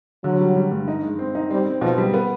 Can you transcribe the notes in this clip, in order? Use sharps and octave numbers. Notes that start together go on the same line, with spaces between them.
D3 F#3
G3
G3
G2
D#4
G#3
C4
D#4
G3 C4
C4
B2 F3
G3
B3